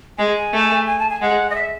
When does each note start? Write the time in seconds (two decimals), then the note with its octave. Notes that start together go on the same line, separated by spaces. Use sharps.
0.18 G#3 G#5
0.53 A3
0.86 G#5
0.99 A5
1.09 G#5
1.22 G#3 F#5
1.50 D#5
1.55 E5